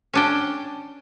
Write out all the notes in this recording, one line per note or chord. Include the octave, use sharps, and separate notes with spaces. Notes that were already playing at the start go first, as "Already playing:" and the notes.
C#4 D4 G5